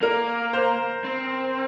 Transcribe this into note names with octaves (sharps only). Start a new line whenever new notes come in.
A#3 A#4
C5
C4